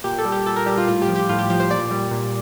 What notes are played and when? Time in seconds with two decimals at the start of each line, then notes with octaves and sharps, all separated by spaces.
0.04 A#2 G4
0.18 A4
0.25 G3
0.32 G4
0.46 A#2 A4
0.56 A#4
0.66 G3 G4
0.78 F4
0.88 A2 F4
1.02 G4
1.08 F3
1.16 G4
1.29 A2 F4
1.39 G4
1.50 F3 G4
1.60 C5
1.70 A#2 D5
1.91 G3
2.11 A#2